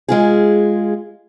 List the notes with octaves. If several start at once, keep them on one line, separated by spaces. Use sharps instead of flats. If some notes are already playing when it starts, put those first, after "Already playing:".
G#3 F4 G#4